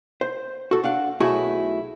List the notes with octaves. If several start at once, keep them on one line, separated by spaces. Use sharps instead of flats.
C5
F#4 A4
D4 F5 F#5
B1 A3 E4 F#4 G#4 E5